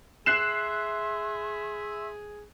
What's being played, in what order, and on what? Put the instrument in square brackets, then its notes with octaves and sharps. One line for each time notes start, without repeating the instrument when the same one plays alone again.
[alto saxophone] G#4 [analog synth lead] E5 [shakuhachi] C6 [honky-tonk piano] F#6 C7 E7